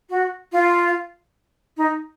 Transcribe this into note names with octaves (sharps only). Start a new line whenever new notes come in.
F#4
F4
D#4